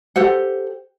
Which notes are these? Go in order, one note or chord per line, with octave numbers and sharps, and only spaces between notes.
G4 A4 C5 F#5